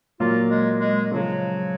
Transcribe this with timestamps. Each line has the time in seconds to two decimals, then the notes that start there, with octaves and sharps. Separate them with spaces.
0.20 A#2 F#3 A#3 F4
0.50 G#3
0.80 G#3
1.11 C#3 F3 F#3 G#3